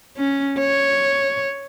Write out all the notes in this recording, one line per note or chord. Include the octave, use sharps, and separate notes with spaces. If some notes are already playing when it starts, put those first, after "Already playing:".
C#4
C#5